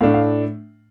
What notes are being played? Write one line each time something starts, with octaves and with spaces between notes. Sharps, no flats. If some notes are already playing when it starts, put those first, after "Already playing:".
A2 A3 D4 F5
F5